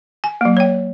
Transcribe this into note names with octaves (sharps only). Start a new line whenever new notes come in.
G#5
F#3 A#3
C#5 G5